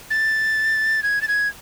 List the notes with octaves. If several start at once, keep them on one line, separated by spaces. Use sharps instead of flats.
A6
G#6
A6
G#6